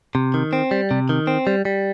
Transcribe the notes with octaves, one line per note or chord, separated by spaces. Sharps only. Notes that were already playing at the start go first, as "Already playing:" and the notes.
C3
D#3
C4
G3
C3
D#3
C4
G3
G3